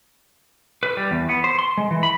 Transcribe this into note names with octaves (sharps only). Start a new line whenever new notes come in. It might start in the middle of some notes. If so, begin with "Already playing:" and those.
B4
G3
E2
B3
C5
C6
G#3
E3
B5